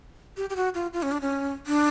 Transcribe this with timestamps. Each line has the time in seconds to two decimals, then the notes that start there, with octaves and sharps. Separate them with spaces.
0.37 G4
0.50 G4
0.56 F#4
0.74 F4
0.93 F4
1.03 C#4
1.12 D4
1.21 C#4
1.67 D4